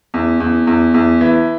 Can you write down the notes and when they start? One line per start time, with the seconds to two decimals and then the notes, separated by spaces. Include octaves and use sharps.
0.14 E2
0.40 E2
0.67 E2
0.94 E2
1.21 E3